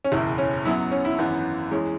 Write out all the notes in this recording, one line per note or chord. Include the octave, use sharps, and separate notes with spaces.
C#4
F#1 E2 B2 E4
C#4
F#2 F#3 B3 E4
C#4
E4
G#1 F#2 E3 B3
E2 E3 G#3 C#4